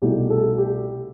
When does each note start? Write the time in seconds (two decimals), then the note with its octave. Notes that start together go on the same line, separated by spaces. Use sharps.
0.02 C2 B2 A3 D#4 G4
0.30 A4
0.58 G4